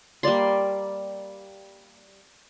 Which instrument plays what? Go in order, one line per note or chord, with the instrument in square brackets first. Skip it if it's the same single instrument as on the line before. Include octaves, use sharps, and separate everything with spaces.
[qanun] G3 A#3 D5 C6